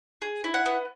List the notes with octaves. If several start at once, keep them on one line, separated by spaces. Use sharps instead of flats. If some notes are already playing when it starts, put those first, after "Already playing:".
G#4
E4
F#5
B3